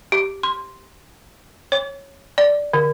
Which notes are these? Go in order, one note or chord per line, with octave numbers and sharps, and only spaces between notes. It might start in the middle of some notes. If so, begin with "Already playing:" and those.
G4
C6
C#5
D5
D3